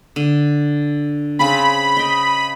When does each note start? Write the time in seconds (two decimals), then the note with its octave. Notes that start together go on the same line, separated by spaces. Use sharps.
0.16 D3
1.39 C#3 C4 B5
1.97 D#5 G5